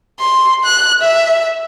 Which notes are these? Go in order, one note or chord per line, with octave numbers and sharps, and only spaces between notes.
C6
F#6
E5